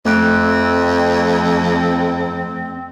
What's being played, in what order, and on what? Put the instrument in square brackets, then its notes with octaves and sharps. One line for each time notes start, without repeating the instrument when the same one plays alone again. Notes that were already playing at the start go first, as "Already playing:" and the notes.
[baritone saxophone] F2 [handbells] A3 F#6 D7 [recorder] C4